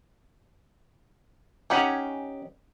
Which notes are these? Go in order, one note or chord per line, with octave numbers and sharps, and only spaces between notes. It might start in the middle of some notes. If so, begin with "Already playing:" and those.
C#4 D#4 G4 F#5 G#5